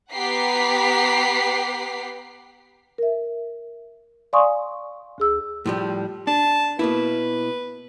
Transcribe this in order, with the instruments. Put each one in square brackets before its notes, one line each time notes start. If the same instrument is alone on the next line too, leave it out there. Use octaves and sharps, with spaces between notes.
[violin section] B3 G4 F#5 A#5 B6 C7
[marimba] A#4 E5
D5 F5 G#5 C6 C#6 D#6
D2 G#4 E6
[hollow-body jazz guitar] A2 F3 G3
[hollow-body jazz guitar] D4 [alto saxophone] A5
[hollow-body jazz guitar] B2 A#3 E4 [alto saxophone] B4